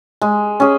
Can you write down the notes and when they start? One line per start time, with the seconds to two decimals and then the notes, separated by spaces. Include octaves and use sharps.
0.21 G#3
0.60 C#4 G#4